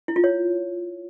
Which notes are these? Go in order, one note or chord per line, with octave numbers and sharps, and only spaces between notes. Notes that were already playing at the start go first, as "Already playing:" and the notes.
E4
F4
C#5